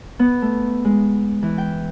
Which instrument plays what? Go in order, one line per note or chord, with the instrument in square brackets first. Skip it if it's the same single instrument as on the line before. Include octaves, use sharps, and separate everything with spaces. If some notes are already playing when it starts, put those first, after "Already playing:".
[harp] B3
A3
G#3
E3
G5